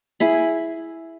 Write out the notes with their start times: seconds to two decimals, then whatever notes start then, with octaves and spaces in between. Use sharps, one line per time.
0.20 E4 G#4 B5